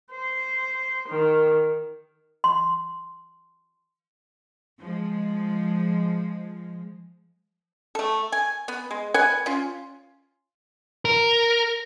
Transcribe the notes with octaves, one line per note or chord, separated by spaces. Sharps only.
C5
D#3
C6
F3 G#3
A3 A4
G#5
B3
G#3
B4 C#5 F#5 G#5
C#4 F4
A#4